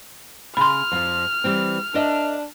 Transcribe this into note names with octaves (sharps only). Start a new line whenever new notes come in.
C#3 B5 C6 F6
F2 F3
E3 G3 C4
D4 A#4 D#5 E5